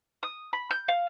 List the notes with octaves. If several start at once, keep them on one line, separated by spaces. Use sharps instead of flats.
D#6
B5
G6
F5